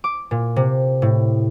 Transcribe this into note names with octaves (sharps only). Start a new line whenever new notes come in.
D6
A#2
C3
A2